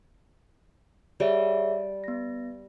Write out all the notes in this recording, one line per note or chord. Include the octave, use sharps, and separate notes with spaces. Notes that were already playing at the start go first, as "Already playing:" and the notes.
G3 G#4 C#5 E5
B3 A#6